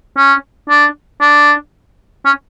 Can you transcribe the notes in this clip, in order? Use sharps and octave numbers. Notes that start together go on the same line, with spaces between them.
C#4
D4
D4
C#4